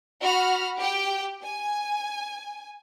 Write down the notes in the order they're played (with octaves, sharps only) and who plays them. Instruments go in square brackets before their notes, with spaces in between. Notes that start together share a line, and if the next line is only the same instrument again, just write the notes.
[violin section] F#4 B5 F6
G4 G5
G#5